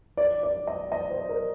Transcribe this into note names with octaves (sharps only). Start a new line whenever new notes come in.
D5
D5
D#5
D#5
C5
A#4